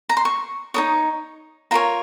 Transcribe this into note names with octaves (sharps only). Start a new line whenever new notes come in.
A#5
C6
C#6
D#4 A#4 C#5 D#6
F4 A#4 C#5 A#5